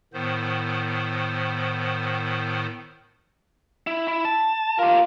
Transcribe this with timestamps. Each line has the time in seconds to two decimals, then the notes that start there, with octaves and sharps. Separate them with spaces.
0.13 A2 D#3 B3 C5
3.87 E4
4.08 E4
4.25 A5
4.79 F4 G4 A#4